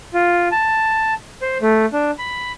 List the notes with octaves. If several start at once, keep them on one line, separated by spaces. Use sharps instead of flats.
F4
A5
C5
A3
D4
B5